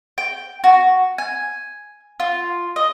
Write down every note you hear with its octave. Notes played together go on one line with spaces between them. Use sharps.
G5
F#4
G#5
F4
D#5